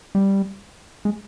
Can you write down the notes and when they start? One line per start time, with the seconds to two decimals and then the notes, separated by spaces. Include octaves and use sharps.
0.15 G3
1.05 G#3